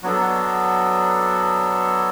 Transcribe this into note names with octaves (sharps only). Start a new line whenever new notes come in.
F#3 B3 D4 A4